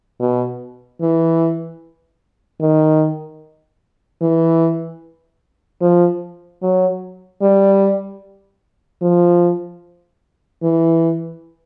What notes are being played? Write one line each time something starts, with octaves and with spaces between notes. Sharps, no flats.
B2
E3
D#3
E3
F3
F#3
G3
F3
E3